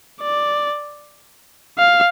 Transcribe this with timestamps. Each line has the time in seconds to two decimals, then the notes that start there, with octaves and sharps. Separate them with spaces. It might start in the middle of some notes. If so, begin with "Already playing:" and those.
0.21 D5
1.78 F5